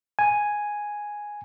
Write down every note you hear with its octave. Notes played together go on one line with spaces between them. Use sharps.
G#5